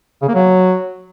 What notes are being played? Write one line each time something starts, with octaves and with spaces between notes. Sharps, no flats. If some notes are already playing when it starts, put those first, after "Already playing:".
C#3
A#3
F#3